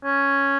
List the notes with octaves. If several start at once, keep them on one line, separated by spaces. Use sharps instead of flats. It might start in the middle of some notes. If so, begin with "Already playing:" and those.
C#4